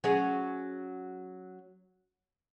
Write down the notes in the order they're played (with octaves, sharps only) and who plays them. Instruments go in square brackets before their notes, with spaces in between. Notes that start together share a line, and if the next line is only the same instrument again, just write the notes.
[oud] F#3 C#4 G#4